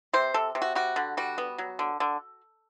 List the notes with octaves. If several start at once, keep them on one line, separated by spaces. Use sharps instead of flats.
C3 C5
C3 A4
C3
F#4
G3 F#4
D3
G3 F#4
B3
F#3
D3
D3